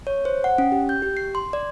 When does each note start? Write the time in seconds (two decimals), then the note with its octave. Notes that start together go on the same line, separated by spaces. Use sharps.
0.07 C#5
0.25 C5
0.44 F#5
0.58 C#4
0.72 G4
0.89 G6
1.02 G4
1.17 C7
1.35 C6
1.53 D5